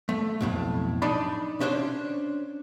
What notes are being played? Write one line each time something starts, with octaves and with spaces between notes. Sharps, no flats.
A3
B1 F2 A2
D4 D#4 D5 B5
C#4 D4 C5 C#5